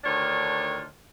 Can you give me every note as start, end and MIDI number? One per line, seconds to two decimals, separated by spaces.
0.04 0.85 38
0.04 0.85 51
0.04 0.85 62
0.04 0.85 65
0.04 0.85 73